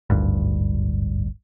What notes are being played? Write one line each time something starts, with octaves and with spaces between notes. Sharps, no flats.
D1 G#1 D2 G2